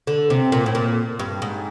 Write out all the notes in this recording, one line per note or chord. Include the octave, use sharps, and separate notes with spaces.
D3
C3
A#2
A2
A#2
G2
G#2